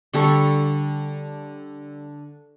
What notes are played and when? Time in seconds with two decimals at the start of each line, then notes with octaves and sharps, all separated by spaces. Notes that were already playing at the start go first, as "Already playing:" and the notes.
0.14 D3 G3 A4 C#6